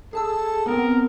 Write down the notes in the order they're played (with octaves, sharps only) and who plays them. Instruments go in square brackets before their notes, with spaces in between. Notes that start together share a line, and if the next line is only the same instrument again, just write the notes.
[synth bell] G#4 A5 E6 [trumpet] A4
[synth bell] B3 C4 [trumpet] A#4